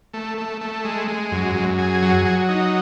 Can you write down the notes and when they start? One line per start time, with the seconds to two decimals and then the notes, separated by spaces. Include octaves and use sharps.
0.14 A3
0.38 A3
0.61 A3
0.85 G#3
1.08 G#3
1.31 F#2
1.55 F#2
1.78 G#4
2.02 F#3
2.25 F#3
2.49 D#4